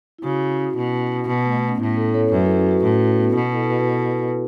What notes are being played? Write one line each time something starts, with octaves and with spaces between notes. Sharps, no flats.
E4
C#3 C#4 F#4
B2
B2
A3
B3
C#4
A2 E4
E4 A4
A4 C#5
F#2 F#4 B4
E4 A4
C#4 F#4
F#4 B4
A2 C#4 F#4
E4
B3
B2
E4 A4
F#4 B4